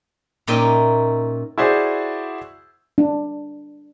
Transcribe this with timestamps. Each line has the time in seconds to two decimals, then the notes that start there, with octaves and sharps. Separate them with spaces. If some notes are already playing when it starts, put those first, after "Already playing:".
0.47 A#2 C#4 D#4 D#5 E5 G5
1.58 E4 F#4 G#4 C5 D5
2.98 D4